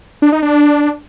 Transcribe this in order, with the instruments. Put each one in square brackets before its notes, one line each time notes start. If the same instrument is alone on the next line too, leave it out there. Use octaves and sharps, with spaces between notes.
[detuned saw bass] D4
D#4
D4